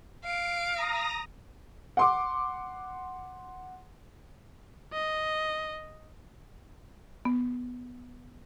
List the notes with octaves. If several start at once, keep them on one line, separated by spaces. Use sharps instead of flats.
F5 D7
A#5 D#6 A#6
F#5 C6 D6
D#5
B3